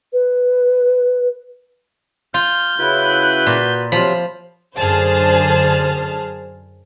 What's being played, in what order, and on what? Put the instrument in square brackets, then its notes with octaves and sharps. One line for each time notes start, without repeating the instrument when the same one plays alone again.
[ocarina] B4
[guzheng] F4 [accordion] F6 [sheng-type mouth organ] G6
[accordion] C#3 E4 F#6 [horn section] F#4 B4
[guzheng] A#2
[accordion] C3 F#3 F4 [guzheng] F3 B5
[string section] F#2 D3 G#4 C5 A5 F6